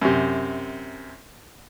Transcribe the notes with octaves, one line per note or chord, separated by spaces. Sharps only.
F#2 C3